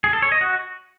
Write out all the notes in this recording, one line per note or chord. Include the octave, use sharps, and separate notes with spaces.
G#4
A4
C#5
D#5
F#4